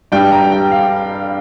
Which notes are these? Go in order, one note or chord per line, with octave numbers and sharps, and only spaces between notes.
G2 G3 D4 G5
A#5
G5
F5